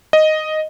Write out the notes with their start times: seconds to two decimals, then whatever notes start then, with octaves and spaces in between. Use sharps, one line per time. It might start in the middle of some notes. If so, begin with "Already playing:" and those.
0.13 D#5